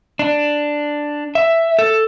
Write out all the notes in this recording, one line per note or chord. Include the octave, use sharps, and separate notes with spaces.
D4
E5
A4